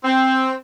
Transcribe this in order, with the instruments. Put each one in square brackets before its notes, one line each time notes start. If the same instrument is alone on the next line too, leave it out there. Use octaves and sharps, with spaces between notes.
[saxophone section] C4